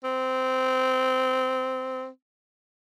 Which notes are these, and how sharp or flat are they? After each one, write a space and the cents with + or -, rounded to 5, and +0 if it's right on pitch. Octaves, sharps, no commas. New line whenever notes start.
C4 -15